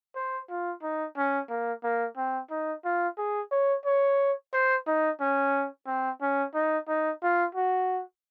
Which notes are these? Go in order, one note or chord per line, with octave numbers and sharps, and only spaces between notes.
C5
F4
D#4
C#4
A#3
A#3
C4
D#4
F4
G#4
C#5
C#5
C5
D#4
C#4
C4
C#4
D#4
D#4
F4
F#4